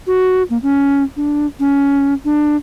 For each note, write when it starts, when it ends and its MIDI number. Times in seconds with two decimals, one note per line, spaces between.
0.07 0.43 66
0.50 0.58 58
0.63 1.03 61
1.16 1.46 62
1.59 2.14 61
2.25 2.56 62